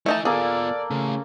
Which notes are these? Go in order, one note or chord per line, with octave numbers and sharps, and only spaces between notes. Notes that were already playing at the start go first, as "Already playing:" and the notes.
A3 D#4 E4 G#5 A5
A#3 B3 F4 G#4 A4 D5
C#3 A3 C#4